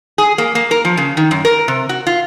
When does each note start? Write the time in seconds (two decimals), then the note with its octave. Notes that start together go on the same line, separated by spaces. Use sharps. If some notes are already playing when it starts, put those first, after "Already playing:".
0.18 G#4
0.38 A#3
0.55 A#3
0.71 A#4
0.85 F3
0.97 C#3
1.17 D#3
1.31 F#2
1.45 A#4
1.68 C3
1.89 F#4
2.07 F4